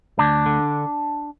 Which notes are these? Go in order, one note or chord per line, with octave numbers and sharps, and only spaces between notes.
D2 D4
D3